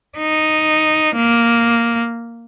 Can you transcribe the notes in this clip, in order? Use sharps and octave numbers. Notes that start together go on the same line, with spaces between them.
D#4
A#3